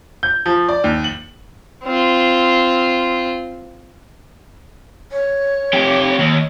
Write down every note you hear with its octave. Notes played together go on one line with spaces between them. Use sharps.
G6
F3
D5
D#2
F#7
C4 F4
C#5
F2 G4
D#2